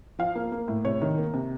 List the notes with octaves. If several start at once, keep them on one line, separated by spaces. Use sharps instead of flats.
F3 F5
A#3
A#3
A2
C3 C#5
D#3
A#3
C3